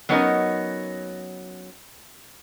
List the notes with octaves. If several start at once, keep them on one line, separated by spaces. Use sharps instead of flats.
F#3 B3 C#4 D#4 A#4 D#5